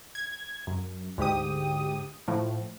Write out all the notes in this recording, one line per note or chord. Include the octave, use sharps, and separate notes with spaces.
G#6
F#2
D2 G#2 G4 D#6
A2 F3